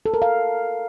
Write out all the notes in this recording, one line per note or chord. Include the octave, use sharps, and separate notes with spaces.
A4
A#4
F5